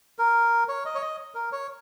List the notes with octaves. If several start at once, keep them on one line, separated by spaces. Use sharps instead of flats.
A#4
C#5
D#5
C#5
D#5
A#4
C#5